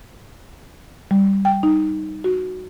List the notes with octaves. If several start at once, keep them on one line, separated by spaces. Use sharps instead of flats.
G3
G5
D#4
F#4